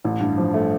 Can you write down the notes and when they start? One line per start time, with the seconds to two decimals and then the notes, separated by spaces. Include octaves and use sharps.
0.04 A1
0.20 G2
0.38 F3
0.54 A3